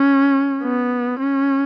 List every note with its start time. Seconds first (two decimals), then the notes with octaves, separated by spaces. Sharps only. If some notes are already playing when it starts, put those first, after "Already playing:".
Already playing: C#4
0.63 B3
1.19 C#4